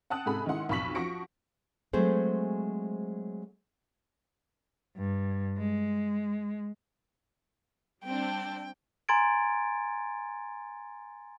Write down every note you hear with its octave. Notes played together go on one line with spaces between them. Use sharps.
F#5 G5 A5 D#6 F#6
G#2 C3 G#4 A4 B5 F#6
D#3 G#3 C#4 E4 F#5 C6
B1 F2 B5 C#6 B6 F#7
F3 F#4 C#6 A#6 C#7 D7
F#3 G#3 A3 C4 G#4 C5
G2
G#3
G3 C4 D4 G5
G#5 A#5 C6 G#6 A6 D7